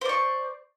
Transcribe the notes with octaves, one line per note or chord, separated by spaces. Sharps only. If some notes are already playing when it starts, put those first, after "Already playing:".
C5 D5 C#6